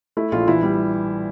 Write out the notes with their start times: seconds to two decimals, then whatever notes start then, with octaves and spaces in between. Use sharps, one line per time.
0.17 A3 E4
0.32 A#1 F4
0.48 E3 E4
0.63 G3